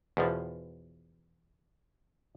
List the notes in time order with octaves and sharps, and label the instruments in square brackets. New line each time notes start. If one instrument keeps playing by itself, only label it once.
[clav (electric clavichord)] E2 B2 F3